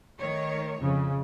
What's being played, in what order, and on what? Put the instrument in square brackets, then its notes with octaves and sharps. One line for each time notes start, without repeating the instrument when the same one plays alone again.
[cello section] D#3 A3 C#5
[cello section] F2 [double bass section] C#3